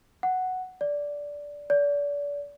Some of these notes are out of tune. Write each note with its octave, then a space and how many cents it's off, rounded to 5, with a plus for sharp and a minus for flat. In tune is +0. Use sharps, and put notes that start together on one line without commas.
F#5 +0
D5 -10
D5 -35